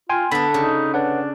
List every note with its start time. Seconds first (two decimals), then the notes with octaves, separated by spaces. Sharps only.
0.09 F4 G5 G#5 C6
0.31 D3 B3 D4 B5 B6
0.54 C#3 D#4
0.94 D4 B4 C#5 F#5